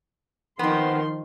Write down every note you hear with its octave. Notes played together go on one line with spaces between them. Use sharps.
D#3 F3 B3 C4 C6